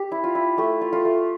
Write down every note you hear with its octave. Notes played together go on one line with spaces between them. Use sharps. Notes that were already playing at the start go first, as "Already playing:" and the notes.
Already playing: G4
E4
F4
E4
A3 G4
F4
F4 A4
A3